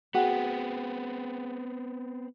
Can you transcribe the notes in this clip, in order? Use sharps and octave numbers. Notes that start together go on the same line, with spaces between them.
B3 C4 F#4 G#4 F#5 G5